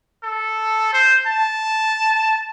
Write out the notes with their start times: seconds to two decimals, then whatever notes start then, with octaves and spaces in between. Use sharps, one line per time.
0.23 A4
0.93 C5
1.27 A5